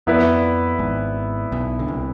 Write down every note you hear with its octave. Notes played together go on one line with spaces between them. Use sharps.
F2 B3 E4 B4 D5
G#1 G#2
B1 B2
D3
C2 C3